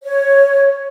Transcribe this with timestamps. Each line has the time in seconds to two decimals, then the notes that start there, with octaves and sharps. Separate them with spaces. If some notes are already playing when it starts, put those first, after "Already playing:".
0.04 C#5